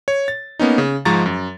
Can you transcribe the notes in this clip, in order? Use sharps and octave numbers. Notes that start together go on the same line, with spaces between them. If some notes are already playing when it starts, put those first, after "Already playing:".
C#5
A6
A#3 B3 C#4 D#4
C#3
G#2 F3 G#3 A#5 C#6 A6
F#2